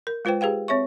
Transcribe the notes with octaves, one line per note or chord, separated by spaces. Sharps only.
A#4
G#3 F4 B4 C5 G5
G4 G#4 B4 F5 G5
C4 C#5 E5 C#6